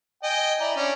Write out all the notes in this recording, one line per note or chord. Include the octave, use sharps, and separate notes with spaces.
D#5 G5 G#5
E4 D5 A#5
C#4 D4